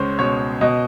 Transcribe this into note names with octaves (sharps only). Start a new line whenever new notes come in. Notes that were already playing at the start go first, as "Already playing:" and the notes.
Already playing: C#2 G#3 C#4 C5 C#5
B2 C#5
B2 D#5